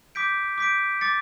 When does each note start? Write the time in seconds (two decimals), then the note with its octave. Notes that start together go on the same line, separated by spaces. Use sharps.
0.15 D6 G6 B6 D7
0.58 D6 G6 B6 D7
1.01 D6 A6 C#7